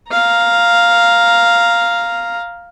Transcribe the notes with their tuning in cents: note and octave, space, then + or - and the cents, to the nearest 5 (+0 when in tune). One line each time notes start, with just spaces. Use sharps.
F5 +0 A#5 +0